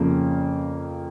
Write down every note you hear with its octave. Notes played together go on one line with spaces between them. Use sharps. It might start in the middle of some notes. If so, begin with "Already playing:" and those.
Already playing: F2 C#3 F3 A#3